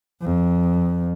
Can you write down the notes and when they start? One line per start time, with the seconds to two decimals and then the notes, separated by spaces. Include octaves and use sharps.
0.22 F2